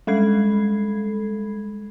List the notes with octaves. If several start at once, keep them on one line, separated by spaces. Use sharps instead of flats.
G3 G#3 A4 B5 G#6 C7